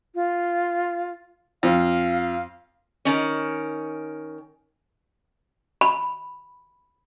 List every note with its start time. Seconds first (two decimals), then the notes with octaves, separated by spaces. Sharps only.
0.15 F4
1.63 F2 F5
3.05 D#3 C#4
5.81 B5